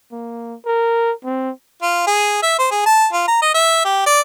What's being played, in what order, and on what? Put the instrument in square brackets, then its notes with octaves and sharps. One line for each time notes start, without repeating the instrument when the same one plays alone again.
[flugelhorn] A#3
A#4
C4
[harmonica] F4
G#4
E5
C5
G#4
A5
F4
A#5
D#5
E5
G4
D5